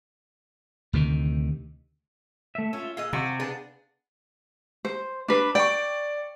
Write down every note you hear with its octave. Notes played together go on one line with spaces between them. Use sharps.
D2 C3 D#3
A3 E5
C#4 F4 E5
A#2 G#4 D#5 F5 E6
C3 F#4
B3 D4 G#4
C5
D4 B4
D5 G5 C#6